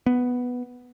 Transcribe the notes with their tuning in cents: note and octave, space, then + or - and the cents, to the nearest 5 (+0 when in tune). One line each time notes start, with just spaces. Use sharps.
B3 +0